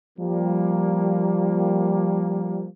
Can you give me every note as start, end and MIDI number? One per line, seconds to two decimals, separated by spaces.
0.19 2.67 53
0.19 2.67 55
0.19 2.67 58